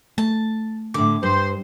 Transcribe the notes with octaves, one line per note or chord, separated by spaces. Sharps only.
A3 A5
A2 D3 D6
G2 C5